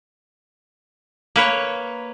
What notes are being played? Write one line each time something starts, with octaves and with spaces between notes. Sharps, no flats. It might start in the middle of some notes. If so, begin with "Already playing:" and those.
A#3 B4 C#5